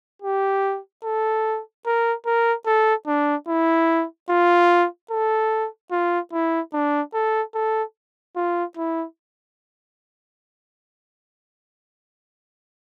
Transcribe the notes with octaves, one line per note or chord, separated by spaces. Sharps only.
G4
A4
A#4
A#4
A4
D4
E4
F4
A4
F4
E4
D4
A4
A4
F4
E4